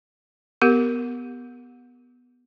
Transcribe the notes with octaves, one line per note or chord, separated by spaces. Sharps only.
B3 G4 A#4